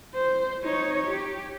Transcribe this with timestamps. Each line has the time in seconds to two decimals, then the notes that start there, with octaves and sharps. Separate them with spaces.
0.14 C5
0.63 D#4 C#5
1.08 G4